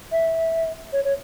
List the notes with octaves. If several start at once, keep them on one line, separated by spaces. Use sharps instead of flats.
E5
C#5
C#5